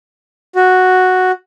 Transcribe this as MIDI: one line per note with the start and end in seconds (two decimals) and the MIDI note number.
0.55 1.31 66